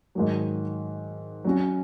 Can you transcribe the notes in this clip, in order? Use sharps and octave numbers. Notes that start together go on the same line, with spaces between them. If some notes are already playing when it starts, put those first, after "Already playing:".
G#2 D#3 F#3
F#3 C#4 F#4